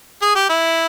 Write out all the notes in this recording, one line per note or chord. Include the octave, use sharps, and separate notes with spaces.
G#4
G4
E4